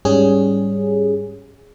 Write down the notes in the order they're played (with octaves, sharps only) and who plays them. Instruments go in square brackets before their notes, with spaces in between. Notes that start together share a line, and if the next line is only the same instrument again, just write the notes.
[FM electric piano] G#2 G3 C#4 G#4